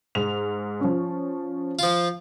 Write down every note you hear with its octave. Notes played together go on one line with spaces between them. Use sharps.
G#2 F7
F3 C#4
F3 F4